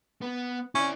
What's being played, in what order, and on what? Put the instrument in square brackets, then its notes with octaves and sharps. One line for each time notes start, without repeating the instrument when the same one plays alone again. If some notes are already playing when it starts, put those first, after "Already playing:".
[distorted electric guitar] B3
[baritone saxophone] C#4 [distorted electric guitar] E4 D5